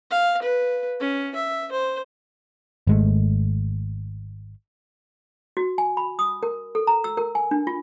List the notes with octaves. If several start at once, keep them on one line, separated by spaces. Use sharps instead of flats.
F5
B4
C#4
E5
C5
G#1 G#3 A3
F#4
G#5
B5
D#6
A#4
A4
A#5
E6
A#4
G#5
D4
F4